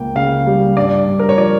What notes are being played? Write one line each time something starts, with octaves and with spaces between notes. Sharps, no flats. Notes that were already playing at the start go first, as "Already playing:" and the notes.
Already playing: C#2 A#3 G5
C#3 F5
G3
G2 D5
G2
A#4
C#5
F3 D5